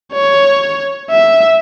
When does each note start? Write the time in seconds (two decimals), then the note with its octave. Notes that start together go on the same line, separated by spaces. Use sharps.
0.13 C#5
1.10 E5